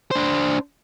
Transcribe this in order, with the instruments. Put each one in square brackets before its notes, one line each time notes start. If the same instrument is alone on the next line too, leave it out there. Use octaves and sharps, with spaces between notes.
[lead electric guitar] D4 C5